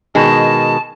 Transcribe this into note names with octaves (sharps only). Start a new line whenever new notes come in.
B2 D#3 G#3 A5